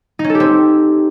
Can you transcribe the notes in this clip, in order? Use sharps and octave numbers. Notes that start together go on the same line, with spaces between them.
D#4
C#4
A4
G4
C4